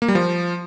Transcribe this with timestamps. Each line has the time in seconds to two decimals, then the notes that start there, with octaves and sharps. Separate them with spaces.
0.02 A#3
0.08 G3
0.15 F3